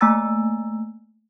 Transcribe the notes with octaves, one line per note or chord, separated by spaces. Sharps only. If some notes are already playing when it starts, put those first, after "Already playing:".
A3 A#3 G#5 A#5 E6 A6